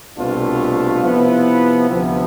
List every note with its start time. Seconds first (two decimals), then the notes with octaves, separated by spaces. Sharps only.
0.17 C2 B2 A3 D4 F4
1.02 C3 F3 B3 E4 B4
1.88 D2 C3 F3 B3